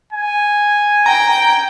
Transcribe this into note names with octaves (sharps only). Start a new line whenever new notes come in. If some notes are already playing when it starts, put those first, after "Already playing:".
G#5
G5 A#5